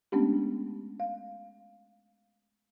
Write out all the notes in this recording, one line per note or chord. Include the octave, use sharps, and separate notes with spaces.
G#3 A3 B3 C#4 D4 G4
F5